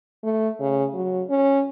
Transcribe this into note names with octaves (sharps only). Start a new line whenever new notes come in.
A3
C#3
F#3
C#4